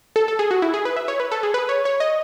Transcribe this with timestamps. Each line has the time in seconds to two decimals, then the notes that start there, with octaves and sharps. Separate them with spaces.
0.16 A4
0.28 A4
0.39 G#4
0.51 F#4
0.62 E4
0.74 G#4
0.85 B4
0.96 E5
1.08 C#5
1.20 B4
1.31 A4
1.43 G#4
1.54 B4
1.69 C#5
1.85 C#5
2.00 D#5